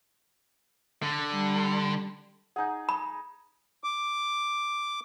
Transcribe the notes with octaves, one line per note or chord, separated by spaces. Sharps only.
D3
G3
D#4 G#4 F#5 G6
B5
D6